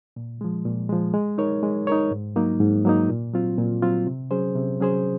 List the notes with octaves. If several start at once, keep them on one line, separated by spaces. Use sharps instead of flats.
A#2
F3 G#3
A#2
F3 G#3
G#3
D#4 A#4 C#5
G#3
D#4 A#4 C#5
G#2
F#3 A#3 D#4
G#2
F#3 A#3 D#4
A#2
F#3 C4 F4
A#2
F#3 C4 F4
C3
F#3 C#4 G#4 C5
C3
F#3 C#4 G#4 C5